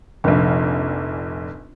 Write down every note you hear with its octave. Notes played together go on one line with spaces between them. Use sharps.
F1 A#1